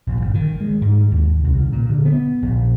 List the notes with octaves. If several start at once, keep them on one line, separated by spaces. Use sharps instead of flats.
A#1
G1
D#3
G#3
G#2
D#2
C2
C#3
A#2
D3
B3
A#1